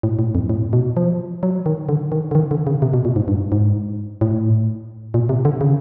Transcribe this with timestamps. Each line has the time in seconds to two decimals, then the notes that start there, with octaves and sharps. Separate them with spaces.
0.03 A2
0.19 A2
0.35 F2
0.50 A2
0.73 B2
0.97 F3
1.43 F#3
1.66 D#3
1.89 D3
2.12 D#3
2.31 D3
2.35 D#3
2.51 D3
2.67 C#3
2.82 C3
2.94 B2
3.05 A#2
3.16 G#2
3.28 G2
3.52 G#2
4.21 A2
5.14 A#2
5.29 C3
5.45 D3
5.61 C#3